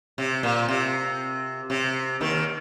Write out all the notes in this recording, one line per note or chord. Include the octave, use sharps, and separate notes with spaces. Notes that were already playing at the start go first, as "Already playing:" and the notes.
C3
A#2
C3
C3
D#2 D#3